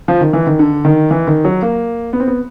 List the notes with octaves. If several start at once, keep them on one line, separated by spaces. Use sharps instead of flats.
F3
D#3
E3
D#3
D3
D#3
E3
D#3
F#3
A#3
B3
C4
B3